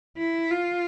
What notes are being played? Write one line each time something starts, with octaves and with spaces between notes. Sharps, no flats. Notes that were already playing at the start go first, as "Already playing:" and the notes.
E4
F4